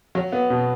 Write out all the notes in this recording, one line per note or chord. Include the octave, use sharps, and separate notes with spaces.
F#3
B3
B2